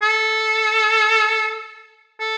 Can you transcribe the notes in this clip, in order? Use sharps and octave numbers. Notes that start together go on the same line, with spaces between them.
A4
A4